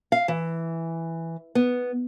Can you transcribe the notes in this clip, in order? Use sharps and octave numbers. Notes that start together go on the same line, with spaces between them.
F5
E3
B3